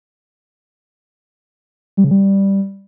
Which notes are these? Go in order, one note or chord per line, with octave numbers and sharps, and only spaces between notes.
G3
C#3
G3